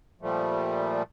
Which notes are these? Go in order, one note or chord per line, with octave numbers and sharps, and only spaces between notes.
A#2 F3 G3 A3